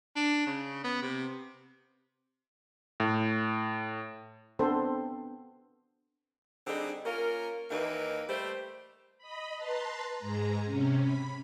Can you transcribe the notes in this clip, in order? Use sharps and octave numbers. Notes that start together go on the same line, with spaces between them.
D4
C#3
B3
C3
A2
B3 C4 D4 A4 C5
D3 G3 C4 D#4 G#4
A#3 C#4 F4 A#4
D#2 E3 A#3 D#4 B4
G3 A3 G4 C5
D#5 B5
B4 A5 A#5 C6
G#2 G#3 A#5
C3 C#4
B5